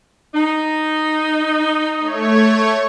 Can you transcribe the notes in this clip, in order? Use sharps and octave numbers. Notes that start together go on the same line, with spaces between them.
D#4
A3 C#5